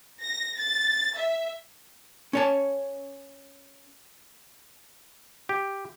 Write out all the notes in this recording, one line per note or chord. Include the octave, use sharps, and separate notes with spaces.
A#6
A6
E5
C#4 C#5 A5
G4